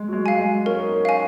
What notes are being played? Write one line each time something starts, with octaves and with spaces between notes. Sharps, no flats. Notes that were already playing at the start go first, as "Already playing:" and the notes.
Already playing: G#3
F#3
G#3
F5 G#5
G#3
C#4 A#4
D#4
C#4
F5 G#5